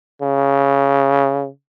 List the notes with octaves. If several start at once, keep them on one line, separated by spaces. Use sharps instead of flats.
C#3